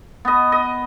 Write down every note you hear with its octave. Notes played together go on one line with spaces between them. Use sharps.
B3 D#5
D#5